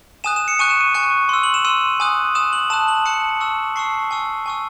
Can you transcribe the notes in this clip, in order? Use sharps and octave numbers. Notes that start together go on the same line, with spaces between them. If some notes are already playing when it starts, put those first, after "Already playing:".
G#5 D#6 F#6 E7
E7
C#7
G#5 C#6 F#6 D#7
E7
D#7
G#5 C#6 F#6
C6 E6
F#7
E7
C6 E6 D#7
G#5 D#6 F#6
G#5 D#6 F#6 E7
F#7
A5 D#6 F#6 E7
F#7
A5 D#6 F#6 C#7
A5 C#6 E6
A5 C#6 E6 C7
G#5 C#6 E6
G#5 C#6 E6